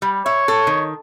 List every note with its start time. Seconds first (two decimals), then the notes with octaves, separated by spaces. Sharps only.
0.02 G3
0.26 C#5 E5
0.48 A4
0.67 D#3